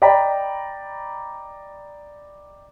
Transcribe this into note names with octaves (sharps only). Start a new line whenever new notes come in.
D5 D#5 G5 A#5 B5 B6